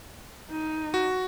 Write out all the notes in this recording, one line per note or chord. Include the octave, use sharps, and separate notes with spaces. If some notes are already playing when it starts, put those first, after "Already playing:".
D#4
F#4